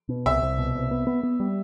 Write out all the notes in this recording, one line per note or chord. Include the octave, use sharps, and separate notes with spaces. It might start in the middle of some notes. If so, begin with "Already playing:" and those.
B2
C2 E5
C2
B2
C2
B3
B3
B3
G3